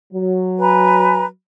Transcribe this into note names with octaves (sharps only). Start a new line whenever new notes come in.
F#3
B4 G#5 A#5